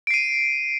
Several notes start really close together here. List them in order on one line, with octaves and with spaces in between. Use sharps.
D7 C7 D#7